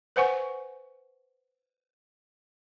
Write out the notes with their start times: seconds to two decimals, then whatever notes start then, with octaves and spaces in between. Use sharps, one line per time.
0.16 B4 C5 F#5 G#5 C#6